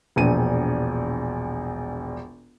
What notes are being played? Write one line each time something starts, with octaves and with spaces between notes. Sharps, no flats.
E1 A#1 D#7